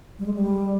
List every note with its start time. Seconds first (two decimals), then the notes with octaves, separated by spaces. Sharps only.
0.19 G3
0.26 G#3
0.34 G3